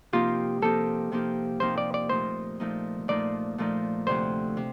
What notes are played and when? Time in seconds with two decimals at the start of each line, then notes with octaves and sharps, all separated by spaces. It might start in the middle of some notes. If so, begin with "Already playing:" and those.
0.13 C3 F3 A#3 D#4 F4 G4
0.62 C3 F3 A#3 D#4 G4 A4
1.12 C3 F3 A#3 D#4 G4
1.60 C3 F3 A#3 D#4 G4 C5
1.78 D5
1.94 D5
2.09 A#2 F3 A3 D#4 C5
2.60 A#2 F3 A3 D#4
3.08 A#2 F3 A3 D#4 D5
3.58 A#2 F3 A3 D#4
4.07 D2 C3 F3 C5
4.57 C3